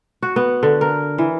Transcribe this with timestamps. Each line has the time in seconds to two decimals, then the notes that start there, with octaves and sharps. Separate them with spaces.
0.23 F#4
0.36 B3
0.63 D3
0.81 A#4
1.18 E3